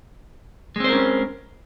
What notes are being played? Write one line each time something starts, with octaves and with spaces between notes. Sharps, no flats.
G#3 C4 C#4 A#4 C5